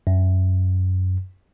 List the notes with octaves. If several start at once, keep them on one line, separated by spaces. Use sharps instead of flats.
F#2